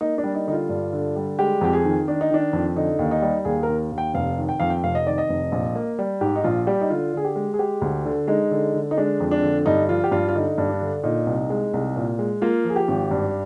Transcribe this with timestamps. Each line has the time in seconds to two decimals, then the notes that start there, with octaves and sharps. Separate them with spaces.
0.01 A#3 D#4
0.18 D4
0.24 G3
0.35 D#4
0.47 D3 D#4
0.52 F4
0.69 G2
0.93 D3
1.16 G3
1.39 G#3 G4
1.61 F2 G4
1.73 G#4
1.85 D#3
2.08 D#3 D4
2.21 D#4
2.31 D#3 D4
2.53 F2
2.76 D3 D#4
2.99 D#2
3.11 D#4
3.22 G3
3.45 D#2 G#4
3.63 A#4
3.69 D#2
3.92 D#2
3.98 G5
4.14 F1 F5
4.38 D#3
4.49 G5
4.60 F2 F5
4.70 G5
4.83 F1 F5
4.95 D#5
5.06 D#3 D5
5.18 D#5
5.29 F1
5.52 A#1
5.75 A#3
5.99 G3
6.21 G#2 G4
6.36 D#4
6.44 A#1 F4
6.67 G3 G4
6.81 D#4
6.90 D3 F4
7.13 D3 G#4
7.25 G4
7.36 G#3
7.54 G#4
7.59 G#3 G4
7.82 D2
8.05 D3
8.27 G#3 D#4
8.51 D3
8.74 D3
8.91 D#4
8.97 G#3 D4
9.20 F2
9.31 D4
9.43 D3
9.66 G2 D#4
9.89 F3 F4
10.04 G4
10.11 G2 F4
10.29 F4
10.35 D3 D#4
10.58 G2
10.70 D4
10.81 D3
11.03 A#2 D#4
11.27 C2
11.50 G#3
11.73 C2
11.96 A#2
12.19 G#3
12.42 A#3 F4
12.64 F3
12.70 G#4
12.76 G4
12.88 G#1
13.11 G2